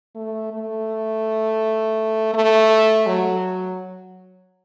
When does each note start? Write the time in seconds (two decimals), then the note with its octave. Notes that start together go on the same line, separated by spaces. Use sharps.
0.15 A3
0.52 A3
2.34 A3
3.07 F#3